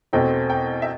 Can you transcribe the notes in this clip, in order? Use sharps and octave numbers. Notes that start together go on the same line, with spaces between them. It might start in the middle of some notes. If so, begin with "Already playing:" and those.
E2 B2 A3 C4 G5
G5
E5